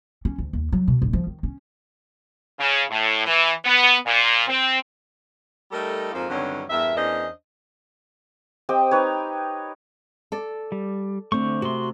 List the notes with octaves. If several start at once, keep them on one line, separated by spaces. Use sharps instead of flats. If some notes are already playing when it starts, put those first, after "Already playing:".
C#4
D2
D#2
F#3
B2
D#1
F3
D#3
C#4
C#3
A2
E3
B3
A#2
C4
G3 A3 D#4 A4 A#4
F2 G#2 F3 A#3 F4
G2 D3 D#3 F#3 C4 C#4
E2 G2 A#4 E5
E2 C#4 D4 A#4 C5 D#5
C4 G4 D#5 G5
D#4 B4 C#5
A4 D5
G3
D3 A3 C4 C5 C#6
C3 F#4 C6